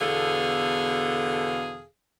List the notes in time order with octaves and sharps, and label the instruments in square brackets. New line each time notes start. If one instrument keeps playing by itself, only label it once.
[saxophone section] E2 B2 D3 G#4 A4 F5